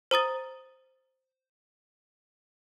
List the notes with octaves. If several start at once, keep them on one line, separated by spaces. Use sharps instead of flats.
C5 A#5 D#6 A6